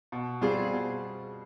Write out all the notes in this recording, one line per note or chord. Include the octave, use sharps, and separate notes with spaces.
B2
G3 C4 F4 G#4
B2